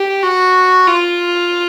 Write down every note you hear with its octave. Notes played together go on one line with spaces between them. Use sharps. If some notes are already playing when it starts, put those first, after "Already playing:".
Already playing: G4
F#4
F4